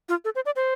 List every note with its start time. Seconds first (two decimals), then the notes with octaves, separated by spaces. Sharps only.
0.09 F4
0.25 A4
0.35 C5
0.46 D5
0.56 C5